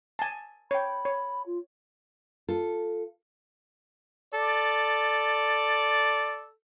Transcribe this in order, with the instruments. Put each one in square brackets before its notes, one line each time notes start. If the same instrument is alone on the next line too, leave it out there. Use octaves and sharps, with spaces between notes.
[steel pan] G#5 A5
[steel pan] C#5 G5 [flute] B5
[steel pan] C#5
[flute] F4
[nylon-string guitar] F4 A4
[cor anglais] A4 [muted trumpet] D5